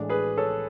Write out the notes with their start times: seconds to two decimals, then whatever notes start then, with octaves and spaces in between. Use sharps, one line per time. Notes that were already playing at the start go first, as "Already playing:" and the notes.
Already playing: A2 E3 G#3 D4
0.09 G#4 B4
0.38 A4 C#5